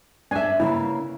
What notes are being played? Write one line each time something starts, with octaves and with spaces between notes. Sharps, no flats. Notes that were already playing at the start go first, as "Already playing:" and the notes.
D4 E5 G#5
C#3 A#3 E4